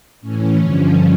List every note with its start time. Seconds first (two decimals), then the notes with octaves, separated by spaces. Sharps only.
0.21 A2 E3 C#4
0.57 G2 D3 F3 C#4